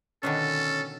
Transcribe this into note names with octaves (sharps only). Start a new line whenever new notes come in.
B2 D3 D#3 C#4 A4